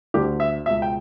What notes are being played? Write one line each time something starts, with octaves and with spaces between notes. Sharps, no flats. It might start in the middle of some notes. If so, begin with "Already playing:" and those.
D2 D3 G4
E5
C#2 B2 E5
G5